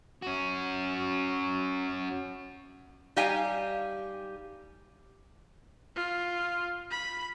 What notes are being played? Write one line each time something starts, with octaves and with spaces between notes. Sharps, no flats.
C#4 F#4
G3 D#4 G4 F5 G#5
F4
B5